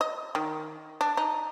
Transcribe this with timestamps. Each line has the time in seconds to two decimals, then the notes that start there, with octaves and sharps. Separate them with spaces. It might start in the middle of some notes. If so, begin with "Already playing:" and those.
0.01 D#5
0.35 D#3
1.01 D4
1.17 D#4